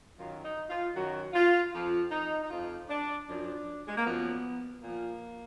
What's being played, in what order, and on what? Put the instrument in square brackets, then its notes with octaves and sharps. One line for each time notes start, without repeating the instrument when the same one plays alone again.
[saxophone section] F#2 D#3 F#3 F4
D#4
F4
F#2 D#3 F#3 F#4
F4
F2 F3 F4
D#4
D#4
F2 F3 F4
D4
F#2 F3 D4
G#3
A#3
F#2 F3 B3
A#2 F3 A#3